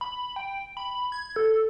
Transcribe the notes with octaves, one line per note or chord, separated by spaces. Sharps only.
B5
G5
B5
G#6
A4